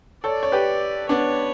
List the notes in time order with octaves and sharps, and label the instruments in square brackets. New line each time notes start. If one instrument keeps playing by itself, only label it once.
[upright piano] A4 C#5 [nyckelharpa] D5
[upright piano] C#5
G4 B4
[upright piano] B3 D4 [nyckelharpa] C#5